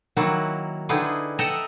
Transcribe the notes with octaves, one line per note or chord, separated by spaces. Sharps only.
D#3 F#3 A#3 E4 F#4
D3 D#4 E4 G#4 B4 G5
A4 D#5 E5 F#5 G5 A#5